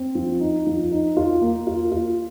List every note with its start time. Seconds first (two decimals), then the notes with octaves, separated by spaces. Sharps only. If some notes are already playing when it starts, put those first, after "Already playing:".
Already playing: C4
0.15 F3
0.40 D#4
0.67 F3
0.91 D#4
1.17 F4
1.41 A#3
1.67 F4
1.92 F4